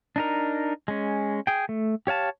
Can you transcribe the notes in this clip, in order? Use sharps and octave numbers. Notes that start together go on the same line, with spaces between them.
D4 D#4 A#4
G#3 C#4
G#4 G5
A3
G4 C#5 F5 A5